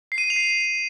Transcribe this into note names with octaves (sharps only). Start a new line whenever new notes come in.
C7
D#7
C7
F7
C7